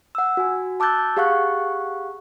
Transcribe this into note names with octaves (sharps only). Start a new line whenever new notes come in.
F#5 E6
F#4 G#5
A5 D6 E6 F#6 G6 A6
G4 G#4 F5 F#5 C#6 F#6